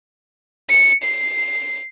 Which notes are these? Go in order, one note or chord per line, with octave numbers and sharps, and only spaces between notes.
C#7
C7